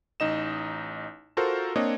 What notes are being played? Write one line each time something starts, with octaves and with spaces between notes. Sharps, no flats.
A1 D#4 D#5 E7
F4 F#4 A4 A#4 C5
A#3 C4 D4 C#5 D#5